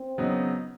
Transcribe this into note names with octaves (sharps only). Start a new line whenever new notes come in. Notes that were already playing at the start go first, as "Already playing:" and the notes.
Already playing: C4
C#3 F#3 B3 D#4